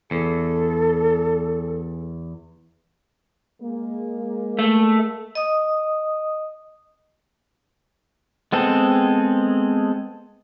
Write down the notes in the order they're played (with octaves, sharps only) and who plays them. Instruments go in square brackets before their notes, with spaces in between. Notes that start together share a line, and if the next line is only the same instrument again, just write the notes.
[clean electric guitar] E2 [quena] A4
[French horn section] G#3 A#3
[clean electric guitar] A3
[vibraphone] D#5 D#6
[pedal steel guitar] G#3 B3 C4 G#4 A4